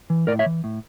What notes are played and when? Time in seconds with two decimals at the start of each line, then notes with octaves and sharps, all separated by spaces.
0.10 E3
0.27 A2 A#4 D5
0.39 C#5 E5
0.46 E3
0.64 A2